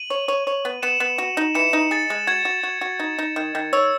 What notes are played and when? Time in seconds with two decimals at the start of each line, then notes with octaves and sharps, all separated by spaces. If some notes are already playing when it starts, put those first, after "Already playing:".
Already playing: D#7 F#7
0.10 C#5
0.28 C#5
0.47 C#5
0.65 B3
0.82 B3 C#7 E7
1.00 B3
1.18 F#4
1.37 D#4
1.55 E3 C#7 E7
1.73 D#4
1.91 G#4 A6
2.10 G#3
2.27 F#4 G#6
2.45 F#4
2.63 F#4
2.81 F#4
3.00 D#4
3.19 D#4
3.36 D#3
3.55 D#3
3.73 C#5 E6